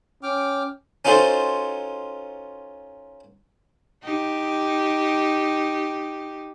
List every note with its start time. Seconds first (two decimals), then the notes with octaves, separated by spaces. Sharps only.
0.23 C#4 G5 D6 F6
1.05 C#4 D#4 F4 F#4 A4 C5
4.03 D#4 G4